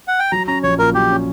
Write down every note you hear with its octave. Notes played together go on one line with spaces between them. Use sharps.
F#5
G5
F#3 A#5
C#4 A#5
A#1 C#5
A#2 A#4
F#3 G4
C#4